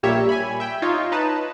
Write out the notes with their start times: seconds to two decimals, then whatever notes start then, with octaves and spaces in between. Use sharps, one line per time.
0.03 A#1 G3 A#3 G4 C#5 E5
0.29 G#5 B5
0.60 E5 G5
0.82 D#4 F4 C#5
1.12 D#4 B4 A5